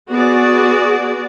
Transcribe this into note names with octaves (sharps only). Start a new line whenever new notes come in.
B3 F#4 G#4 D5